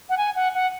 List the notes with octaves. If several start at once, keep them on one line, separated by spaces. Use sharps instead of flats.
F#5
G#5
F#5
F#5